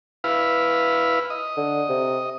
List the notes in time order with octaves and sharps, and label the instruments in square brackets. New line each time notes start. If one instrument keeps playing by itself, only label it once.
[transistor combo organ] E4 B4 F5
D#5
[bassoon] D3
C3